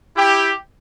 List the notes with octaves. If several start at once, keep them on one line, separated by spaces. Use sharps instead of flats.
E4 G4